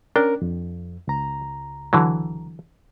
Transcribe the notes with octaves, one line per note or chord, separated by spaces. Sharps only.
C#4 D4 A#4 G5
F2
C#2 A#5
D3 E3 F#3